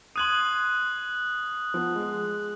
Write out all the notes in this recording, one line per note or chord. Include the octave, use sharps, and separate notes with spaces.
C6 D#6 F#6 G#6 D#7 F#7
F3 B3
G#3